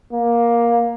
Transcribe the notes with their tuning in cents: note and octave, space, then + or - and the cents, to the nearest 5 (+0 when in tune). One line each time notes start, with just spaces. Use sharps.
A#3 +10